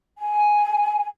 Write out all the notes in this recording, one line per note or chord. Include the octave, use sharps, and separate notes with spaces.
G#5